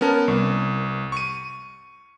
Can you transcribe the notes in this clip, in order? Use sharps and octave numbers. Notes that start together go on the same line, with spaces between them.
B3 C#4 A#4 A5
C2
C#6 D#7